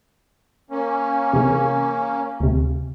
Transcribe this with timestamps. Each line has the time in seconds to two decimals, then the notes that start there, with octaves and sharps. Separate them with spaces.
0.71 A#3 C#4
1.33 C3 E3 G#4
2.40 D2 C3